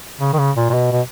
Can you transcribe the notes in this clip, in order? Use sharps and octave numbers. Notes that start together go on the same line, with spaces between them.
C#3
D#3
C#3
A#2
A#2
B2
B2